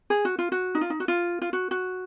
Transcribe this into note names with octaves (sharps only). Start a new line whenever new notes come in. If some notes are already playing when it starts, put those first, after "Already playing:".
G#4
F#4
F4
F#4
D#4
F4
D#4
F#4
F4
F4
F#4
F#4